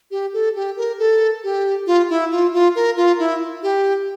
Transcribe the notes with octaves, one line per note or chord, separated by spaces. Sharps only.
G4
A4
G4
A#4
A4
G4
F4
E4
F4
F4
A#4
F4
E4
G4